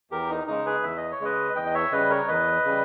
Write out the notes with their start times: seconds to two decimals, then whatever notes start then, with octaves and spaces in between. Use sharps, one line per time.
0.11 E2 G4 A#4
0.30 D#4
0.47 C#3 G#3 D#4
0.66 G#4 B4
0.83 E2 E5
0.97 D#5
1.12 C#5
1.21 C#3 G#3 B4 D#5
1.56 E2 D#5 G5
1.66 D#5
1.74 C#5 E5
1.92 C#3 G3 B4 D#5
2.10 A#4 C#5
2.28 E2 B4 D#5
2.65 C#3 G3